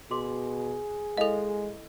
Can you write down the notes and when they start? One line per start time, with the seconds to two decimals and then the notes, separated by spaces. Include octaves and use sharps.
0.11 B2 F#4 G#4 C6 D6
1.17 G#3 E4 A4 B4 D#5 F5